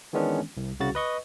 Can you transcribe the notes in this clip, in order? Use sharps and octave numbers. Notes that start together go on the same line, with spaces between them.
D#3 E3 G#3 B3 C#4 D4
C2
C2 C#3 F#4 A6
B4 D#5 C#6